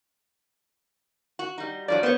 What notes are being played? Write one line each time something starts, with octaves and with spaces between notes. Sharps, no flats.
F#4
G3 D#4
G2 F3 F#3 D5
B3 C5 C#5